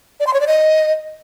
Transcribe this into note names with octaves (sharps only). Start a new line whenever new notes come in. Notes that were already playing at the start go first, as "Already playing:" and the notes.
D5
C6
C#5
D5
D#5